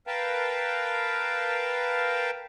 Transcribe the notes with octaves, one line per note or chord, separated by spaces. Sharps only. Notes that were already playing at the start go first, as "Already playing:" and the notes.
A#4 B4 F5 G5 A5